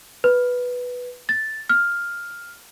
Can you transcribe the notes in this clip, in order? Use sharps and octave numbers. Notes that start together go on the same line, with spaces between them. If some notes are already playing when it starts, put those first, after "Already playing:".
B4
A6
F6